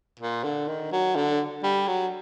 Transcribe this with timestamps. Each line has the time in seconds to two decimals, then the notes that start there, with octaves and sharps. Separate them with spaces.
0.20 A#2
0.44 D3
0.68 D#3
0.92 F#3
1.16 D3
1.63 G3
1.88 F#3